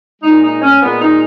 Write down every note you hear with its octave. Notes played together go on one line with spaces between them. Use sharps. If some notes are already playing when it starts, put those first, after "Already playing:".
A#2 G#3 D#4
D#4
C#4
A#2 G#3 B3
D#4